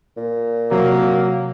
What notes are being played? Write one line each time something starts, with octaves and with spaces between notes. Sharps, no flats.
A#2
C3 F#3 A#3